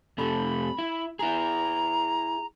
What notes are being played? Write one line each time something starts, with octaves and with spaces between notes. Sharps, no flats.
F2 C3 A3 B5
E4
E4 G#4 A#5